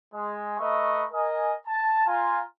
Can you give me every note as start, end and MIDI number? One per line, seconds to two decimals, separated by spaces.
0.14 0.55 56
0.58 1.03 57
0.58 1.03 71
0.58 1.03 75
0.58 1.03 76
0.58 1.03 82
0.58 1.03 85
1.12 1.53 70
1.12 1.53 75
1.12 1.53 80
1.66 2.04 81
2.06 2.41 65
2.06 2.41 80
2.06 2.41 82